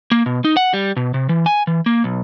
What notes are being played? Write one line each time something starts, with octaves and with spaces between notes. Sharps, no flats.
A#3
B2
D#4
F#5
G3
B2
C3
E3
G#5
E3
A#3
B1